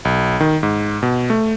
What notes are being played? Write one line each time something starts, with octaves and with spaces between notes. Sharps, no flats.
B1
D#3
G#2
B2
A3